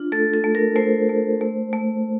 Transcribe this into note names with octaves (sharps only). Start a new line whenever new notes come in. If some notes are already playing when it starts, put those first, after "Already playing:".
Already playing: D4 F4
A3 A4
A4
A3
A#4
A3 C5
A3
A3
A3